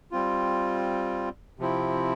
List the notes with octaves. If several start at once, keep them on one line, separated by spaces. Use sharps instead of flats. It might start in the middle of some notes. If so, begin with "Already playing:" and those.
G3 C4 F4
C3 F3 C4 E4